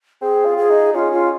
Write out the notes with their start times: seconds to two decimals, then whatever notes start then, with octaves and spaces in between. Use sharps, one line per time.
0.22 C4 G#4
0.46 F4
0.58 G#4
0.70 D#4
0.94 C#4 F4
1.12 F4